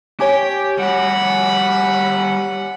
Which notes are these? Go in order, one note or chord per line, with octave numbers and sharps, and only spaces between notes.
G4 C#5 G5 G#5 D6
G3 F#4 F#5 B5